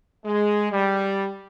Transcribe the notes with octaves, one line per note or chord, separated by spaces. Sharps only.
G#3
G3